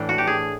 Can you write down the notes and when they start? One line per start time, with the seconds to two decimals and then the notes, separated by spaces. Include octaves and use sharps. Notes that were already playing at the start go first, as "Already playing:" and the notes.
Already playing: A2 E3 A3 D4
0.09 F#4
0.18 G4
0.27 G#4